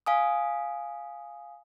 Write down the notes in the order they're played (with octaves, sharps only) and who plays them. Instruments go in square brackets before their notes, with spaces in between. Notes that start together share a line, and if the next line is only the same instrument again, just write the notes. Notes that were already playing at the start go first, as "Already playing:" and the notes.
[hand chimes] F5 G#5 D#6